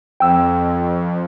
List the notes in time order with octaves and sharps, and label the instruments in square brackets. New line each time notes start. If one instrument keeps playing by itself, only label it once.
[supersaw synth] F2 [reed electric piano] G5 E6